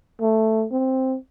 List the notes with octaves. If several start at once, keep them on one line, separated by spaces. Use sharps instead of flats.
A3
C4